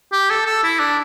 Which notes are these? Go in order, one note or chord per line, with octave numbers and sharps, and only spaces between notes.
G4
A4
A4
E4
D4